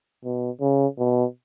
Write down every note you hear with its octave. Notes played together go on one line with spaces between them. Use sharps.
B2
C#3
B2